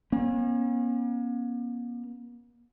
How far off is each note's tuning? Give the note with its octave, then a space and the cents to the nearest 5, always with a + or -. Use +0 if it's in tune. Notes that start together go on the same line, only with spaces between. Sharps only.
A#3 +45 C#4 -35